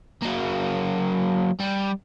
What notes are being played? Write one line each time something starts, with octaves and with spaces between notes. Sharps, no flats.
F#3 A#3
G3